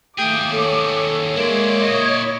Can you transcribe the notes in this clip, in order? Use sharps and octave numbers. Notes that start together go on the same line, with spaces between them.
D#2 A3 G#4 G5 D6
A4 C#5
G#3 A#3 E4 C#5 D5
A#2 C#5 D#5